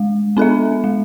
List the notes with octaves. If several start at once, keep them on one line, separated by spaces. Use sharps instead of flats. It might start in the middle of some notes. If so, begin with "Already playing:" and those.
Already playing: G#3
B3 D4 A4 E5
G#3